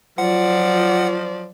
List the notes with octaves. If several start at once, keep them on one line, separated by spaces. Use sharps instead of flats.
F3 F#3 F4 D5 F#5